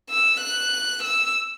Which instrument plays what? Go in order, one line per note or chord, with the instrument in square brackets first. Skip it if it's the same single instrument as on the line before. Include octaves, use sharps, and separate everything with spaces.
[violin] E6
F#6
E6